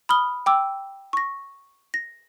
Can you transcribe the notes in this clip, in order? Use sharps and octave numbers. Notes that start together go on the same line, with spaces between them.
B5 D#6 F6 G7
G5 D6 E6
C#6 A#6
A#6